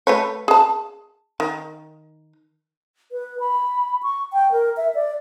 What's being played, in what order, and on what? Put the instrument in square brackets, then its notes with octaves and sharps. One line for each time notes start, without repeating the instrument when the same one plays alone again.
[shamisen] A3 B4 C#5
G#4 A5
D#3
[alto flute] B4
B5
C#6
G5
A#4
E5
D5